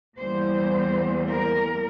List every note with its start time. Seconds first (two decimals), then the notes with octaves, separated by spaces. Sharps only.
0.18 E2 E3 G3 A#3 C5
1.28 A#4